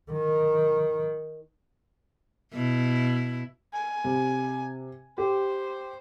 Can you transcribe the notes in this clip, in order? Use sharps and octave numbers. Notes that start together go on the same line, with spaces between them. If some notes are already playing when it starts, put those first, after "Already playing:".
D#3
B2 E4
G#5
C3
G4 C5